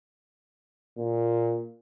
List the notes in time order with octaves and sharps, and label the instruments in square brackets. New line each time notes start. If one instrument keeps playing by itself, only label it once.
[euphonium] A#2